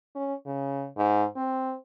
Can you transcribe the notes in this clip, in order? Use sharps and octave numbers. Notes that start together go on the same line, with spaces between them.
C#4
C#3
G#2
C4